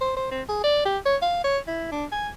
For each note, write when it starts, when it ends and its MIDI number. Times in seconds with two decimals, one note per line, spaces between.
0.01 0.14 72
0.17 0.28 72
0.32 0.42 60
0.49 0.64 68
0.64 0.85 74
0.85 0.98 67
1.06 1.16 73
1.22 1.42 77
1.44 1.58 73
1.68 1.87 64
1.92 2.05 62
2.12 2.29 80